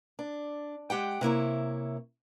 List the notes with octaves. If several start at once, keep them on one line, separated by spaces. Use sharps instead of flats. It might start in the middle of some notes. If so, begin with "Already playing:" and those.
D4
G#3 G4 F#5 G5
C3 A#3 E4 C#5